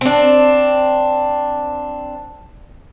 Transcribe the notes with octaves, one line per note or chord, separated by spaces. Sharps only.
C4 D4